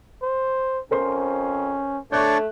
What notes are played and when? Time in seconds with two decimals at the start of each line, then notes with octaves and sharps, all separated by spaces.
0.22 C5
0.91 F2 C#4 A#4 C5 C6
2.12 A3 D4 C#5 D5 C#6 F#6 G6